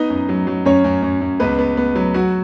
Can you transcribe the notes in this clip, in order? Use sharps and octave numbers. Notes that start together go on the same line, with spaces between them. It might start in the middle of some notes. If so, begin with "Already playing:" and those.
Already playing: B3 D#4 D#5
F#2
F#3
F#3
F#2 C#4 C#5
F#2
F#2
F#2
C#2 B3 B4
B3
B3
F#3
F#3 F#4